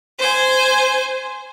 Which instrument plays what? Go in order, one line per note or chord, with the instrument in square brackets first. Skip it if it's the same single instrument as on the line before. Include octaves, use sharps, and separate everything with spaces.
[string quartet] C5 G#5